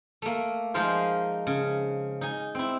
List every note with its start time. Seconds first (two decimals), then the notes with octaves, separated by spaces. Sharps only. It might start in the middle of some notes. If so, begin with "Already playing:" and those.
0.22 A3 A#3
0.74 F3 G#3 D#4 F4 A#4 C5
1.47 C#3
2.21 D#4 G#5
2.55 C4 E4